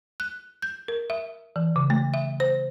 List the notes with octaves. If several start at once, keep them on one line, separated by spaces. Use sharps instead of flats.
F#6
G6
A#4
E5
E3
C#3
A3
E5
C5